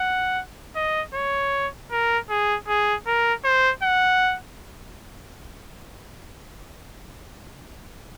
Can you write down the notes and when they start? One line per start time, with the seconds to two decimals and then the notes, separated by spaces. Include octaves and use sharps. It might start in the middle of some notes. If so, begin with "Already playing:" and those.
Already playing: F#5
0.76 D#5
1.14 C#5
1.91 A#4
2.30 G#4
2.68 G#4
3.07 A#4
3.45 C5
3.83 F#5